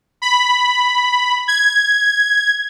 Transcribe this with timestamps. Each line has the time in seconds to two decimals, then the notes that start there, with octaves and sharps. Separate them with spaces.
0.22 B5
1.48 G#6